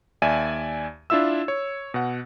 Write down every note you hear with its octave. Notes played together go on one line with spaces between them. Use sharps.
D#2 D5 E5 G#5 D#7
D4 E4 F4 E5 E6
C#5
B2 F#5